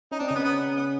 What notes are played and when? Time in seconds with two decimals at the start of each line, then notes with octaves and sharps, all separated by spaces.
0.12 C#4 D#4
0.19 C4 D4
0.28 D#4
0.31 C#3 B3 C#4
0.44 B3
0.77 B3